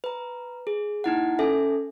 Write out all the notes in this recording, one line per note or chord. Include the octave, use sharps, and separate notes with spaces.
B4 A#5
G#4
A#3 D#4 E4 F#5
C#4 A4 E5 G#5